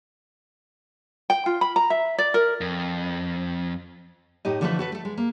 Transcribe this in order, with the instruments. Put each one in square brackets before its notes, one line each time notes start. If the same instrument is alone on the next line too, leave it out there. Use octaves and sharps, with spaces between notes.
[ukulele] G5
F4
B5
A#5
E5
D5
A#4
[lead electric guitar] F2
[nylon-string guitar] A2 D#4 G4 D#5
D3 E3 F3 A3 A4 B4
F#4 A4 B4
A3 A4
G#3
A#3